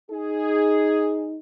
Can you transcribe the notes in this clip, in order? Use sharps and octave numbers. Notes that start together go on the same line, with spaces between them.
D#4 G#4